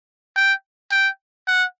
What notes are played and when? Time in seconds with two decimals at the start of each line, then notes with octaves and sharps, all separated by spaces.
0.36 G5
0.92 G5
1.47 F#5